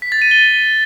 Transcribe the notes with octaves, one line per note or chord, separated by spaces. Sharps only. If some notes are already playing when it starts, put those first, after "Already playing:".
B6
A6
D#7
G7